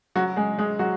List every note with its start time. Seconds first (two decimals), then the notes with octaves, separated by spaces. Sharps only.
0.16 F#3 F#4
0.36 G#3 G#4
0.58 G#3 G#4
0.79 F#3 F#4